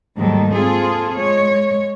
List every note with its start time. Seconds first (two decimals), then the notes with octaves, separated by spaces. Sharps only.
0.18 D#2 G#2 D#3 F#3 G3 A4
0.51 C4 F4 G#4 A4
1.18 G#3 C#5